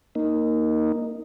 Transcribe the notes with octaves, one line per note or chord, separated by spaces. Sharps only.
A#3 D#4